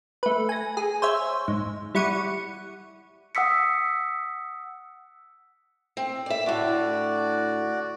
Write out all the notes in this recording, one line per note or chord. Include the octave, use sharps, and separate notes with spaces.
A3 B4
G#5 A#6
G#4
C5 C#5 E5
G#2
G3 E4 F#5 C#6 D#7
F#5 D#6 E6 B6 C#7
C4
D5 E5
A2 D3 F#4 D5